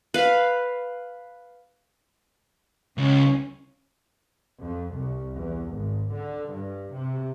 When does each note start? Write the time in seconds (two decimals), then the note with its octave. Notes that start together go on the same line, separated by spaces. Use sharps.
0.14 B4 F5
2.98 C#2 C#4
4.61 F2
4.96 C2
5.36 E2
5.74 G#1
6.12 D3
6.52 G2
6.94 C3